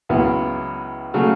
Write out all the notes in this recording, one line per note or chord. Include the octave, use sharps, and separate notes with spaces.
C#2 C#3 F#3 B3 E4
C#3 F#3 A3